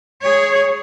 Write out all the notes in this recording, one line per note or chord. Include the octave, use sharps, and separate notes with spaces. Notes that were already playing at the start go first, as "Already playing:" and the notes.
G#4 C#5